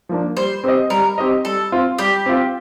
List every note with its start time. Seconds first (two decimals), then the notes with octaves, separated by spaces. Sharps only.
0.09 F3 A#3 D4
0.37 G3 C5
0.64 C4 G4 C5 D#5
0.90 G3 A#4
1.18 C4 G4 C5 D#5
1.45 G3 A4
1.72 C4 F4
1.99 G3 G4
2.26 C4 F4